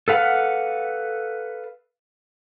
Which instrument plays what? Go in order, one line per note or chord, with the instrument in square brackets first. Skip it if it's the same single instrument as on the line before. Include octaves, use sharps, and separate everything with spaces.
[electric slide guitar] A4 B4 F5 F#5